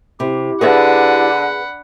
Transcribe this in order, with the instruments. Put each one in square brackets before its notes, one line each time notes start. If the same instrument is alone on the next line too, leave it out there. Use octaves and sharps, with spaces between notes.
[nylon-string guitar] C3 [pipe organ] E4 G4
[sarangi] D3 [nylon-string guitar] G#4 B4 E5 [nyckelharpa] F#5 B5